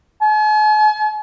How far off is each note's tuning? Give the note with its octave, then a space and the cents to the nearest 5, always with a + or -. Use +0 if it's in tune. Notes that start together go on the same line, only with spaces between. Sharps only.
G#5 +45